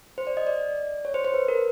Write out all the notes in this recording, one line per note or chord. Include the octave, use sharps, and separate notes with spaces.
C5
D5
D#5
D5
C#5
C5
C5
B4
A#4